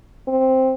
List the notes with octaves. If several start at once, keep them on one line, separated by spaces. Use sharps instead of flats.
C4